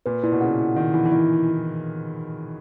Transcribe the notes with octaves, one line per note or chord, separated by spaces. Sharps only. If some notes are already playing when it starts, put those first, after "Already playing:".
A#2 B4
A#2 E4
B2
C#3 F#5
E4
D#3 F#5
E3 E4
E3
D#3 E4